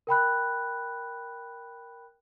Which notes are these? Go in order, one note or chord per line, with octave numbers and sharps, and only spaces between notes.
A#4 G5 B5 F#6